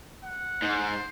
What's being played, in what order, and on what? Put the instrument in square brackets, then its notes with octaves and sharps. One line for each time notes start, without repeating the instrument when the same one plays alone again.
[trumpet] F#5
[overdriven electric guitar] G#2 [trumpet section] C5